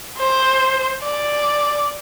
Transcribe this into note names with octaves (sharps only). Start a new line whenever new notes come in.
C5
D5